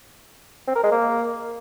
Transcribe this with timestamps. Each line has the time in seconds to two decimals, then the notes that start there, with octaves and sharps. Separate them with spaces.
0.68 C4
0.76 A#4
0.84 G#3
0.92 A#3